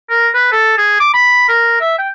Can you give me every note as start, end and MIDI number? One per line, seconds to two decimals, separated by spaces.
0.10 0.28 70
0.34 0.52 71
0.52 0.76 69
0.78 0.96 68
1.00 1.10 86
1.14 1.48 83
1.48 1.77 70
1.81 1.95 76
1.98 2.09 79